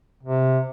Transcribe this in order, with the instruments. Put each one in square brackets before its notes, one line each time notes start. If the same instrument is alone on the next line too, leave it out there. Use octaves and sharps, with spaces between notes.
[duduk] C3